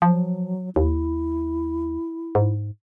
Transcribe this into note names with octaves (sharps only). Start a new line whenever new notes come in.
F3 F#3
D#2 E4
G#2